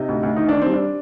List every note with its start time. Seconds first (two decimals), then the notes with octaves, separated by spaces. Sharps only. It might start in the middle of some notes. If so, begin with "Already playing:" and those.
Already playing: C3 D#4
0.08 D2
0.23 D2
0.36 D#3 D#4
0.49 D#3 D4
0.62 G3 C4
0.73 D4